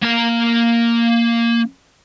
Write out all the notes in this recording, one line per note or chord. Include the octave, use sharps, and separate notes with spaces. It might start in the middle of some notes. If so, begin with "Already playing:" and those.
A#3 A#5